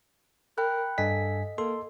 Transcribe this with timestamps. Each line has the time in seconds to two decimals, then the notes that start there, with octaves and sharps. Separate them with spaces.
0.58 A#4 G5 B5 F#6
0.98 G2 A4 D#5 G#5 B6
1.58 A#3 A4 C6